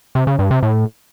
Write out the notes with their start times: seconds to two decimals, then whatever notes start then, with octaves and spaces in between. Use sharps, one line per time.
0.15 C3
0.27 C#3
0.39 G2
0.51 C3
0.63 A2